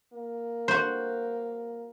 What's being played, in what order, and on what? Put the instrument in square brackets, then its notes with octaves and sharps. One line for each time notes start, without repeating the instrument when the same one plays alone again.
[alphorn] A#3
[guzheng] F#4 C5